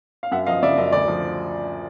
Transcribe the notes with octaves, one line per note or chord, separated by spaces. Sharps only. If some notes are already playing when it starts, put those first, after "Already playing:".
F5
F#2 E5 F#5
F3 D#5 F5
C#3 D5 E5
F#2 D#5
D2 D5
F3